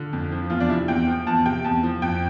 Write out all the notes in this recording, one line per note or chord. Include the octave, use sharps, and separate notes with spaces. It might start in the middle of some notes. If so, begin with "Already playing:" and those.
Already playing: D3 F4
F2
F3
E2 F4
D4
C3 E4
E2 G5
F3
E2 A5
C3 G5
E2 A5
F3
F2 G5